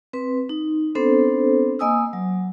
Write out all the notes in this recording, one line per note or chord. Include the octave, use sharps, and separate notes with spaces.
C4 B4
D#4
B3 C4 D4 A4 C5
A#3 D#5 G#5 D#6 E6
F#3